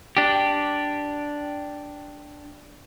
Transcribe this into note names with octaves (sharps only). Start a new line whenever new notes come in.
D4 G4